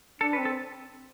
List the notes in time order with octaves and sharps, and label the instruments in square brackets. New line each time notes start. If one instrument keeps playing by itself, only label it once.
[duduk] D4 [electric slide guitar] A4
[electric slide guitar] B4
[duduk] C4
[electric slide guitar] A4